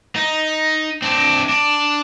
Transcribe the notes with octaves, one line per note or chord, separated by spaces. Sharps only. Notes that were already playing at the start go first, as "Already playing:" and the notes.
D#4
C4 D4
D4